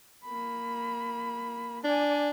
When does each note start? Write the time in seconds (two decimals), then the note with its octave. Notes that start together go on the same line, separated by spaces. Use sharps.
0.24 A#3 B5
1.84 D4 D5 G#5